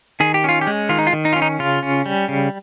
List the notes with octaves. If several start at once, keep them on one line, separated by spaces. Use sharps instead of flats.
D#3 G#4
G4
C#4 F4
G4
G#3
D#3 F4
D#4
F4
D#3
D#4
C#4 F4
D#4
C#3 F4
C#4
G3
C#3